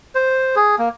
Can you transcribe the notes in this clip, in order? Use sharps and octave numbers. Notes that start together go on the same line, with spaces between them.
C5
G#4
A#3